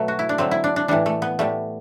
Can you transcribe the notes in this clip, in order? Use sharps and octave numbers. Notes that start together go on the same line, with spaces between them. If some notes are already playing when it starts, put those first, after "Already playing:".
Already playing: B2 F#3 A3 B3
F#4
E4
D4
D3 F#3 A3 C4
E4
D4
D4
A2 E3 G3 D4
A3
B3
A2 G3 A3